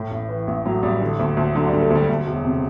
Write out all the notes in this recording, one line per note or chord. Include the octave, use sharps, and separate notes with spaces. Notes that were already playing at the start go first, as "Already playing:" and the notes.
Already playing: A2
A1
E3
A1
A2 F#3
A1 G3
D3
D2
D2
D3 F#3
G3
D3
A3
D2
G3
D2
E1
C3